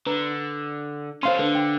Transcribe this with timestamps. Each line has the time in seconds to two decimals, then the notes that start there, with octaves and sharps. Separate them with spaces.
0.07 D3 B4 A#5
1.23 C#4 A4 C5 F5 C6
1.39 D3 A4 B4
1.55 G5